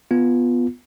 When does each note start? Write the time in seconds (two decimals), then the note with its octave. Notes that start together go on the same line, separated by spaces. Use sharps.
0.11 B3 F4